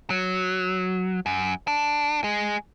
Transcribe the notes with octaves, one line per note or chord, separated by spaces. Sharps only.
F#3
F#2
D4
G#3